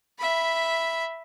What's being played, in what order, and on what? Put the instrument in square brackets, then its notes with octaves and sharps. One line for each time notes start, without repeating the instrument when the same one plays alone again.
[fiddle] E5 B5